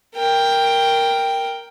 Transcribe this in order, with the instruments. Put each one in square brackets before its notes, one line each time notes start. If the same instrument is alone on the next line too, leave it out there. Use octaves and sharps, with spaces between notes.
[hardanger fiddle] A#4 G5